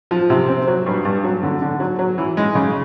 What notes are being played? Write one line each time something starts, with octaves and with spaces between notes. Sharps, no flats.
F3
C3
C4
F#3
G2
G2
F#3
D3
D3
F#3
F#3
E3
G#3
C#3